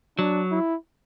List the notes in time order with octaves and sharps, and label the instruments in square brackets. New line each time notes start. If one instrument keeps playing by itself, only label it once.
[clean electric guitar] F#3 [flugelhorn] D4
[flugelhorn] E4